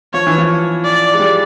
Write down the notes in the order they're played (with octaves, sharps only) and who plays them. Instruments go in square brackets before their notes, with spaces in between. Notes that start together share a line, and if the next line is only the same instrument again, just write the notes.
[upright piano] F3 [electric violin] C#5
[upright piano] E3
F3
[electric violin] D5
[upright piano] G#3
G3